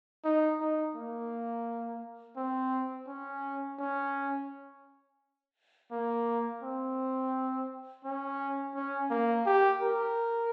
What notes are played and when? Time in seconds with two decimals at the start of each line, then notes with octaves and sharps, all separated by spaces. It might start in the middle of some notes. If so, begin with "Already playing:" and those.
0.24 D#4
0.60 D#4
0.95 A#3
2.37 C4
3.07 C#4
3.79 C#4
5.91 A#3
6.63 C4
8.05 C#4
8.75 C#4
9.10 A#3
9.46 G4
9.82 A#4